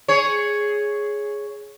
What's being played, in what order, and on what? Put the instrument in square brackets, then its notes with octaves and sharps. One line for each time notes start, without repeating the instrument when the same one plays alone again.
[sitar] G#4 C#5